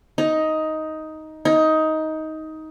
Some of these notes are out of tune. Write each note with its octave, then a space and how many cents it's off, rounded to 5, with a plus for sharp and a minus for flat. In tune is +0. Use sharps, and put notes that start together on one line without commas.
D#4 +10
D#4 +15